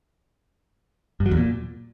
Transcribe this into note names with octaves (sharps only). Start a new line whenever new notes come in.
G2
F#3
E2
A#2